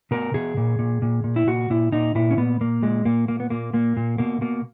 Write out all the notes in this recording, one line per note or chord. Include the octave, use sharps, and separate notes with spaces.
B2 A#4
B2 G#4
A#2
A#2
A#2
A#2
E4
A#2 F#4
A#2 E4
A#2 D#4
A#2 E4
C#4
A#2 B3
A#2 A#3
A#2 G#3
A#2 A#3
A#2 A#3
B3
A#2 A#3
A#2 A#3
A#2
B2 A#3
B2 A#3